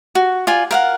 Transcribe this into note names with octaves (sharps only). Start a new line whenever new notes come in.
F#4
F4 D5 G#5
A#4 F5 F#5